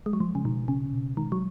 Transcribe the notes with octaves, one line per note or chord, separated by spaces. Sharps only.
G#3
F#3
F3 G#3
C#3
B2 D#3
C#3 C#4
B2
D#3 G#3
F#3